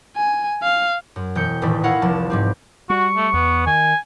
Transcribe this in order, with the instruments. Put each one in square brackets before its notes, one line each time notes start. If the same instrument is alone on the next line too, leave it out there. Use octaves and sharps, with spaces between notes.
[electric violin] G#5
F5
[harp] F#2
E1 G5 G6 C#7
D#1 A1 A2 D5 B6
E4 A#4 C#5 F5 F#5
F1 C2 F3 A5
G#2 G3 C4
[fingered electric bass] G3 [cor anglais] F#4 [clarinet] C#6
[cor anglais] A3
[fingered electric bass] E2 [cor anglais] B3
[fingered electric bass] D#3 [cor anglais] G#5